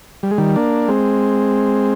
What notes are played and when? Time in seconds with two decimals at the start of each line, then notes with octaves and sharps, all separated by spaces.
0.23 G3
0.31 G#3
0.38 D#3 G3
0.56 A#3 D4
0.88 G#3 C4